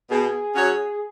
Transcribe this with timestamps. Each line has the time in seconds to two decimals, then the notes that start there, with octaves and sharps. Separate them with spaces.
0.11 B2 G#4
0.54 F#3 C#4 F#4 C#5